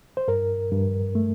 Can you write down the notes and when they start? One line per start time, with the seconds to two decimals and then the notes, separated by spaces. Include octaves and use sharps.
0.17 C5
0.28 G2 A#4
0.72 G2
1.15 A3